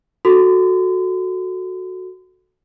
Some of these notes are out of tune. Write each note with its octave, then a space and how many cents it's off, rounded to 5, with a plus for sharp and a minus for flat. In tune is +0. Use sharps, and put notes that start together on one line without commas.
F#4 -5 A4 +0 C6 -45